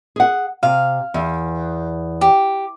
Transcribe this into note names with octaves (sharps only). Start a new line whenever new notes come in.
G#4 F#5
C3 F5
E2
G4